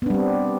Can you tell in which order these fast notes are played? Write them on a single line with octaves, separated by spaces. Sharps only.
B3 D4 G3 C4